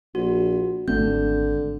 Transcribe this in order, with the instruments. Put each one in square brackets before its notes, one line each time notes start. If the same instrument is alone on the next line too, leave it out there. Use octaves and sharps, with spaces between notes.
[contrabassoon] A#1 [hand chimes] F#4
[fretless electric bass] G#1 A3 C4 [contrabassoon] D3 [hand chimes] G6